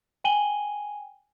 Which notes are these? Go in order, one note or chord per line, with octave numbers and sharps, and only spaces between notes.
G5 G#5 D#7 F#7 G7